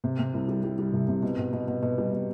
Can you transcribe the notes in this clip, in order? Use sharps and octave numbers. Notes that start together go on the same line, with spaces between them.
C3
C3
C2
G3
G3
G3
C2
C3
B2
B2
B2
B2
B2
G3
B2